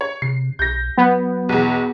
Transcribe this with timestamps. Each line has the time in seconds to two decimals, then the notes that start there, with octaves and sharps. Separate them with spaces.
0.01 C#5
0.22 C3 C7
0.59 B1 G6 A#6
0.98 F#3 B3
1.49 B1 E2